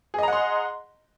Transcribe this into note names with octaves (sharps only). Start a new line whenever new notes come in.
G#4 D#5 F#5 A#5 C6